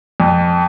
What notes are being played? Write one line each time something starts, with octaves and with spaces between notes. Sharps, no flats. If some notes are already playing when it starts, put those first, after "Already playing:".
F2